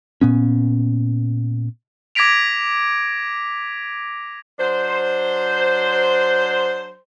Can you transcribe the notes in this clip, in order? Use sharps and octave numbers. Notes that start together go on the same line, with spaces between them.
A#2 B3 C#4
D6 G#6 A#6 B6 D7 F7
F#3 D4 C5